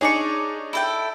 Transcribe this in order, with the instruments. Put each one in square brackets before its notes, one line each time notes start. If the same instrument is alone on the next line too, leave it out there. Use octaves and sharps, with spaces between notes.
[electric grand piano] D4 D#4 C#5 [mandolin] G#4 D5 C#6
[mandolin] E4 A4 G5